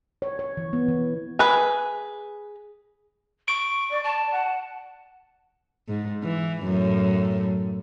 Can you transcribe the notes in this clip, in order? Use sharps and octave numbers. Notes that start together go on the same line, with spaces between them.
C#5
C#5
E3
B3
E3
G#4 B4
C#6 D7
D5
D5 A5
F#5
G#2
E3
F#2 A2